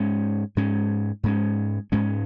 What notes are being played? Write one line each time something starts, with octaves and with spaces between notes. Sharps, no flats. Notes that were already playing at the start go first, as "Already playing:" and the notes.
Already playing: G#2 G#3 C#4
G#2 G#3 C#4
G#2 G#3 C#4
G#2 G#3 C#4